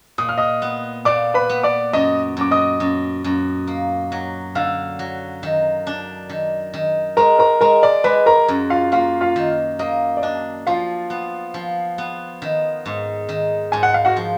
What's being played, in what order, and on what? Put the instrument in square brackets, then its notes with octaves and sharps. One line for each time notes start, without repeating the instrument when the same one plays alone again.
[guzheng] A#2 [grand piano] D#6
[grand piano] F6
D#5 D#6
[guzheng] B3
[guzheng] A#2 [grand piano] D5 D6
[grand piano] B4 B5
[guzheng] B3
[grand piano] D5 D6
[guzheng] F#2 [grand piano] D#5 D#6
[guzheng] F#2 [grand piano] D6
[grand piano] D#5 D#6
[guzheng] F#2
F#2
A#3
F#3
[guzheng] D3 [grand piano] F5 F6
[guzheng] F#3
D#3
D4
D#3
D#3
[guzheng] G#3 [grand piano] A#4 A#5
[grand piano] A#4 A#5
[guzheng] G#3 [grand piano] A#4 A#5
[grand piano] D5 D6
[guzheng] G#3 [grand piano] B4 B5
[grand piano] A#4 A#5
[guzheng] F#2
[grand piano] F4 F5
[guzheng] A#3 [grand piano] F4 F5
[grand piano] F4 F5
[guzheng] D#3
[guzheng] A#3 [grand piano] D#5
[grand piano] D5
[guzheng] D4 [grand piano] D#5
[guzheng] F3 [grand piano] F4 F5
[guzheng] B3
F3
B3
D#3
G#2
D#3
[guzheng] G#2 [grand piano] G#5
[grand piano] F#5
F5
F#4 F#5
[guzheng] F3